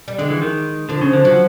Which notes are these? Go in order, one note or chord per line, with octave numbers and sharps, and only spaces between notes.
G3
D3 G#3
E3
D#3
D3 F3
C#3
D3
F3 F#3